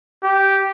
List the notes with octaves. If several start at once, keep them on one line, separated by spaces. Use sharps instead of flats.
G4